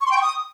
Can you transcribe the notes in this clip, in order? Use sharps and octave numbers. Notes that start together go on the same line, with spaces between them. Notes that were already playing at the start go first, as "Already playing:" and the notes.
C#6
C6
G5
C#6
D#6